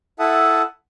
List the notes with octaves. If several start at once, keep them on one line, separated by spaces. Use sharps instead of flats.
E4 A4 E5 F#5 A5 D#6